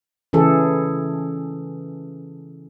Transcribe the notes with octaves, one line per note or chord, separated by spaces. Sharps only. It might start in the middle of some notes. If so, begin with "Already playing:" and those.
C#3 E3 G#4 A4